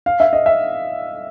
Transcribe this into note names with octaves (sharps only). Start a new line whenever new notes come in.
F5
E5
D#5
E5